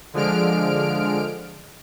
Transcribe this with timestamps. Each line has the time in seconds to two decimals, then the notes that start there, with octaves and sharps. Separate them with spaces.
0.14 D3 F3 G#3 F6 D7